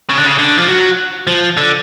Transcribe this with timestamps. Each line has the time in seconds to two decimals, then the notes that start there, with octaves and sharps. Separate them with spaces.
0.09 C#3
0.17 D3
0.25 C#3
0.38 D3
0.58 F3
0.69 F#3
1.27 F3
1.57 D3